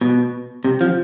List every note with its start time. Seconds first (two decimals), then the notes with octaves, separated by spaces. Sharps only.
0.01 B2
0.64 C3
0.81 F3